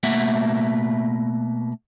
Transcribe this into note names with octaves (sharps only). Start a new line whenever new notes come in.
B2 A3 A#3 E5 F#5